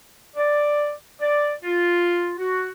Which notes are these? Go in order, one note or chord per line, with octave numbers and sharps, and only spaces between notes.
D5
D5
F4
F#4